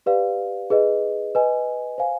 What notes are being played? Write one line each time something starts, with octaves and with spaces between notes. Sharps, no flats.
G4 B4 D5 F5
D#4 G#4 B4 D#5
B4 D#5 G#5
C5 F5 G#5